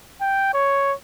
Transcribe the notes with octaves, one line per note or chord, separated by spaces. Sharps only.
G5
C#5